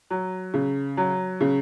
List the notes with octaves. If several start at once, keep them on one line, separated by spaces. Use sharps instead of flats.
F#3
C#3
F#3
C#3